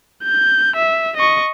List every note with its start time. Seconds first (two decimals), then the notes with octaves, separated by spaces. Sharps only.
0.23 G6
0.76 E5
1.17 D#5 C#6